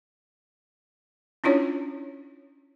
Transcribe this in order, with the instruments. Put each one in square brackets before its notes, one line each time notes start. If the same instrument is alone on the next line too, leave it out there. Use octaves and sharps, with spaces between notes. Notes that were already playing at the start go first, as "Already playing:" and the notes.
[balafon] C#4 D4 E4 F4 C#5